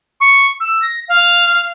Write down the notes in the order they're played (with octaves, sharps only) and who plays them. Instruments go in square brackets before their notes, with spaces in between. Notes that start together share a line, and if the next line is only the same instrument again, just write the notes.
[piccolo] C#6
E6
A#6
F5